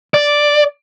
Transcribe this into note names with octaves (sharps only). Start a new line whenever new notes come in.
D5